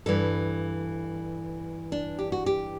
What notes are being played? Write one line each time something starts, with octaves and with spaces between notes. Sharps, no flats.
G2 E3 A4
D4
G4
F#4
G4